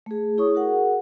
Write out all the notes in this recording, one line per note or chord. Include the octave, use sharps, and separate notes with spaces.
A3 G#4
E4 G#4 C#5 C#6 D#6
F#4 G#4 A#4 F#5